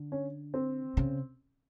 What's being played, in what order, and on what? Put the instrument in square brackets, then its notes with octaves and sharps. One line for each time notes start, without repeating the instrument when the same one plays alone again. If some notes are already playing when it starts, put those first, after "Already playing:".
Already playing: [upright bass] D3
[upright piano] C#4
C4
[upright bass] C#3